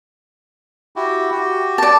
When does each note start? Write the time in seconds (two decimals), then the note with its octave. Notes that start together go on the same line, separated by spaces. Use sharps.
0.96 E4 F#4 G4
1.32 F#4 G4
1.78 D5 A5